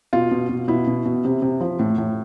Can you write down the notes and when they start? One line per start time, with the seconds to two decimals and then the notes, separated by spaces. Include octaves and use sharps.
0.13 B2 F4
0.31 B2
0.49 B2
0.68 B2 E4
0.87 B2
1.05 B2
1.25 C3
1.42 C3
1.61 F3
1.79 A2
1.98 A2